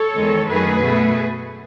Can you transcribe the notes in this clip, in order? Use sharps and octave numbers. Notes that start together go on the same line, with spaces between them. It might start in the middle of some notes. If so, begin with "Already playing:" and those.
Already playing: A4 C#5
E2 D#3 G#3
F#2 D#3 A3 G#4 B4
B2 A3